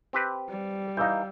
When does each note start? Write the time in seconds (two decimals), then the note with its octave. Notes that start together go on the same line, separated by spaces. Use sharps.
0.13 C4 G4 B4
0.49 G3
0.97 E3 D#4 F5 E6 G6